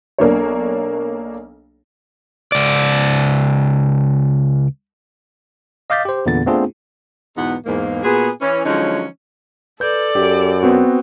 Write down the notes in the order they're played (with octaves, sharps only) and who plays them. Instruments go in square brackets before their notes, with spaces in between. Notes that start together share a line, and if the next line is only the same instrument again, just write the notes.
[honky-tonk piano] B1 A#3 D4 C#5
[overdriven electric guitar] C#2 D5
[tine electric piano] D#5 F5 D6 G6 A6 B6
G4 C5
E2 A#2 D3 B3 A6
A3 B3 C4 D4 F4 G#4
[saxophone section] E2 G#2 B2 B3 D#4 F#5
E2 G#2 A#3
A#2 B3 F#4 G#4
E3 C#4
D3 F3 F#3 G#3 C#4 D#4
[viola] A4 D5 [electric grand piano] B4 G6
[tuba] F#2 [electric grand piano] G4
[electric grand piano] B3 C4 F#4